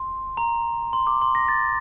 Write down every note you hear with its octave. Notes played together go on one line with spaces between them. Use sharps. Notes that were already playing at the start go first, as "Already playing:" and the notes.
Already playing: C6
A#5
C6
D6
C6
A#6
A6